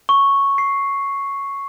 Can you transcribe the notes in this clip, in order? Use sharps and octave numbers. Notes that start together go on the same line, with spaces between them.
C#6
C7